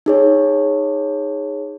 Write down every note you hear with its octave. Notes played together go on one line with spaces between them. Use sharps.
D#4 G#4 C#5